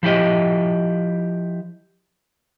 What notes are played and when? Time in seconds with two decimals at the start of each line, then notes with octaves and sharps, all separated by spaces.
0.03 F3 E4 G4 D#5